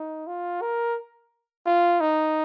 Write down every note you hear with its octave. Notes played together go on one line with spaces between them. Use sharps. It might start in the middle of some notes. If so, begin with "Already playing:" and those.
Already playing: D#4
F4
A#4
F4
D#4